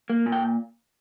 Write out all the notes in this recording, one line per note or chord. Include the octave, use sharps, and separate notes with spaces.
A#3
A#2
G5